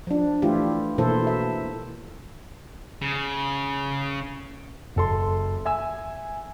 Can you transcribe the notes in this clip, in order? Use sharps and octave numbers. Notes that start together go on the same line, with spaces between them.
F3 D4
E3 A3 E4 F4 G4
B2 E3 A#3 E4 A4 C5
E5
C#3
F#1 A4 C6
E5 G#5 E6